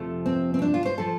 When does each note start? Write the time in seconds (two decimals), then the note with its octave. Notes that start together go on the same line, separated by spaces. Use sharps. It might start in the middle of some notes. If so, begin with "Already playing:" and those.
Already playing: F2 C3 F3 A3
0.26 C4
0.54 C4
0.62 D4
0.74 F4
0.86 C5
0.98 F3 A4